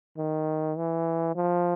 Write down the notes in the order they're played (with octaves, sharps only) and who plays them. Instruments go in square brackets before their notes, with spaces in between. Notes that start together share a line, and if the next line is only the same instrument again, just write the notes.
[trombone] D#3
E3
F3